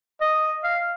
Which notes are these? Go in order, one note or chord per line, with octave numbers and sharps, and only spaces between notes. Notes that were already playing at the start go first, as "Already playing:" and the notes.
D#5
F5